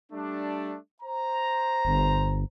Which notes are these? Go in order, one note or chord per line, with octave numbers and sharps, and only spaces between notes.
G3 A3 D4
C5 A#5
G1